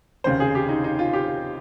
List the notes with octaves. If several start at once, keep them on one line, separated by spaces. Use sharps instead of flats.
F1 D#2 C#3 C5
G#4
G4
D#4
D#4
F4
G4